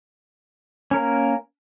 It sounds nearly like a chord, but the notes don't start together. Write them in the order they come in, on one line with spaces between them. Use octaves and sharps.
C#4 A#4 A#3